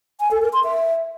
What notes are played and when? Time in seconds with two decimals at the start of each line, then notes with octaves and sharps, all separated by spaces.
0.20 G#5
0.31 A4
0.42 A#4
0.53 C6
0.64 E5